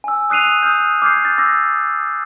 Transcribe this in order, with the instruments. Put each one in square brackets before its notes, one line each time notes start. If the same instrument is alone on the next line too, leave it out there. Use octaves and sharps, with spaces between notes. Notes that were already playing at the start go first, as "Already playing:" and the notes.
[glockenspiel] G#5 E6
D#6 F#6 C7 D#7 F7
D#6 F6 G6
D6 F6 G6 G#6 C7
G6 A6
D6 E6 A#6